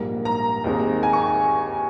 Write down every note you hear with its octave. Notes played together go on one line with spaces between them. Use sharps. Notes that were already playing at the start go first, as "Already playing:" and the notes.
Already playing: A#1 G#2 G3 A#3
A#5
D#2 D#3 G#3 C4
G#5
C#6